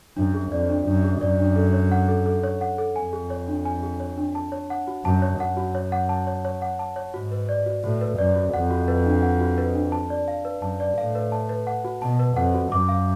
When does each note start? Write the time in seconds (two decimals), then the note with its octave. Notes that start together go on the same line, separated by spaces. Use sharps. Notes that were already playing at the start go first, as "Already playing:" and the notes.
0.16 F#2 D4
0.34 G#4
0.52 F2 D5
0.69 D4
0.87 F#2 D4
1.04 G#4
1.21 F#2 D5
1.39 D4
1.56 A4
1.73 C#5
1.91 F#5
2.08 A4
2.26 A4
2.43 C#5
2.61 F#5
2.78 A4
2.96 F2 G#5
3.13 G#4
3.30 C#5
3.48 D4
3.65 G#5
3.83 G#4
4.00 C#5
4.18 D4
4.35 A5
4.52 C#5
4.70 F#5
4.88 F#4
5.05 F#2 A5
5.22 C#5
5.40 F#2 F#5
5.57 F#4
5.75 C#5
5.92 F#5
6.09 A5
6.27 C#5
6.45 C#5
6.62 F#5
6.79 A5
6.96 C#5
7.14 G#2 F#4
7.31 B4
7.49 D5
7.66 F#4
7.84 A2 F#4
8.01 B4
8.18 F#2 D5
8.36 F#4
8.54 F2 F#5
8.70 F#4
8.88 B4
9.06 D4
9.23 F#5
9.40 F#4
9.58 B4
9.75 D4
9.92 A5
10.10 D5
10.28 F5
10.45 B4
10.62 F#2 A5
10.80 D5
10.97 A2 F5
11.15 B4
11.32 A5
11.49 B4
11.67 F#5
11.85 F#4
12.02 B2 A5
12.19 B4
12.36 F2 F#5
12.54 F#4
12.71 F#2 D6
12.89 F5